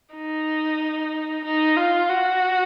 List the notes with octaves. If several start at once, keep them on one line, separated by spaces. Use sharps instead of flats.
D#4
D#4
F4
F#4